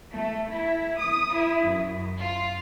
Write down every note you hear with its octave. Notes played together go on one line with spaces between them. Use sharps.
A3
E4
D#6
E4
F#2
F4